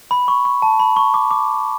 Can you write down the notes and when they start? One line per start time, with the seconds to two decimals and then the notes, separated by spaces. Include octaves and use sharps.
0.11 B5
0.28 C#6
0.45 C#6
0.62 A5
0.80 B5
0.96 C#6
1.14 D6
1.31 D6